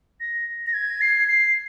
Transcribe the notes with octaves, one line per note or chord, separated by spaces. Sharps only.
A#6
A#6
G#6
C7
C7